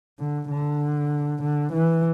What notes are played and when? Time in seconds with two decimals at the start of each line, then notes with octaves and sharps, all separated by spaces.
0.19 D3
0.50 D3
1.42 D3
1.73 E3